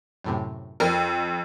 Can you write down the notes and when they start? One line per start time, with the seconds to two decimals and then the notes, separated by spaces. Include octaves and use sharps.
0.24 F#2 A2 C3
0.80 F2 A#4 F6